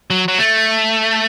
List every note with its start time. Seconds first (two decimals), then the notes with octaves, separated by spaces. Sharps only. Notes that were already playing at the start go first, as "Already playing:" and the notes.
0.10 F#3
0.28 F#3
0.38 A3